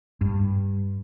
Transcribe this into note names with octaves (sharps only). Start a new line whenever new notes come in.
G2